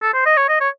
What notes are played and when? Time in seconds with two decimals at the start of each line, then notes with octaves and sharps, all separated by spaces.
0.03 A4
0.14 C5
0.26 D#5
0.37 C#5
0.49 D#5
0.60 C#5